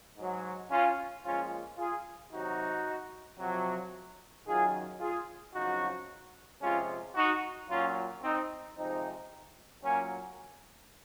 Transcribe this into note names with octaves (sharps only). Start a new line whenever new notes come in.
G#2 F#3
C#4 F4
A#2 F3 G#3 C#4 F4
F4 G#4
C3 D#3 F#3 D#4 F#4
F2 C3 F#3
F#2 D#3 F#3 F4 G#4
F4 G#4
F2 C#3 F#3 D#4 F#4
C3 F3 G#3 C#4 F4
D#4 F#4
A#2 F#3 C#4 F4
C4 D#4
C3 F3 G#3 C4 D#4
A#2 F#3 A#3 C#4